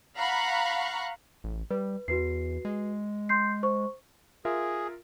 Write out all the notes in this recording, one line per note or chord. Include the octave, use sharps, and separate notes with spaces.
F5 F#5 A#5 B5 C#6 F#6
A1
G3 B4
E2 F#4 B4 C7
G#3
C6 G6 C7
C5 C#6
F4 G#4 A#4 E5